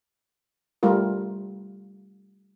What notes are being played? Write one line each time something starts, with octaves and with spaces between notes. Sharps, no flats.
G3 A3 F4 A#4